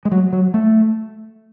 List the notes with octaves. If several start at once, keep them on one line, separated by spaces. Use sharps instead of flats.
G#3
F#3
F#3
A3